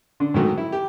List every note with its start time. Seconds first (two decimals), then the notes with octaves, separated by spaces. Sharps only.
0.20 D3 D4
0.34 G#2 D#3 F#3 A3
0.58 E4
0.72 G4